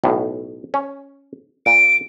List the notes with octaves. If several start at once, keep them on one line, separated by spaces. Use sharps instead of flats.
B1 A2
C#4
A#2 D7